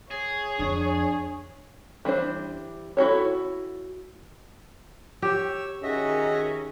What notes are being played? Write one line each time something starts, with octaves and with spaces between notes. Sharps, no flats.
G#4 C#5
F2 D4
E3 G3 D4 C5
E4 F#4 A4 C#5
G4 C#5 E6
D#3 C#4 F#4 G#4 D#5 E5